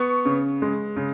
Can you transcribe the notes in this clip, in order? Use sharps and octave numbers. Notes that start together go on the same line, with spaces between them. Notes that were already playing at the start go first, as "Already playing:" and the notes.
Already playing: B3 C#6
C#3
G#3
C#3